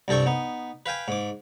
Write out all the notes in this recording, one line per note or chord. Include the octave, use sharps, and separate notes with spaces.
C2 G2 A4 G5 C#6
B3 D#4
B4 F5 G5 G#5
G#2 D6